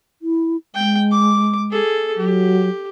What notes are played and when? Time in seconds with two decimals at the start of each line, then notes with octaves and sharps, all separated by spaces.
0.22 E4
0.75 G#3 G5
1.12 D6
1.71 G#4 A4
2.16 F#3 G4